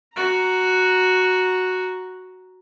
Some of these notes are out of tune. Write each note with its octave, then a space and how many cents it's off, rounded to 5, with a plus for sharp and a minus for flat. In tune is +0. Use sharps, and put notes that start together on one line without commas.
F#4 +0 A#5 +0